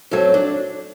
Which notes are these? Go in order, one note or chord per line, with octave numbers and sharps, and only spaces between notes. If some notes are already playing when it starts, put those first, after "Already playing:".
F#2 F#3 C4 A4
D4